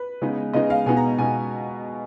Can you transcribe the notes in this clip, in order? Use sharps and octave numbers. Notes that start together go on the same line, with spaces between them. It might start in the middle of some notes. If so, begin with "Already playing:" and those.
Already playing: B4
C#3 G#3 B3 D#4
C#3 G#3 B3 D#4 D#5
F5
B2 G#3 B3 D#4 G#5
A#5
B2 G#3 B3 D#4 G#5